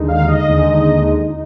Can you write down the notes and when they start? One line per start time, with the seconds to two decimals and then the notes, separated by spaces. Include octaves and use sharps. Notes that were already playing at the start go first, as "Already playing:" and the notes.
Already playing: D#2 D3 G#3 D#4
0.08 F5
0.28 D#5
0.48 D#2 D3 G#3 D#4
1.30 D#4